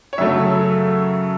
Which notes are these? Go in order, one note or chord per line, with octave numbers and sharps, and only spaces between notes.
C#5
F#2 C#3 F#3 A3 E5